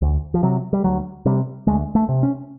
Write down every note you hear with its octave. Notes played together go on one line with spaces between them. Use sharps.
D2
F3
C3 F#3
G3
D2 F#3
C3 G3
D2 G#3
A3
C3
C#4